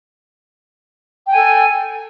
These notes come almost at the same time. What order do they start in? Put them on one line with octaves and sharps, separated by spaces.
G5 G#5 A4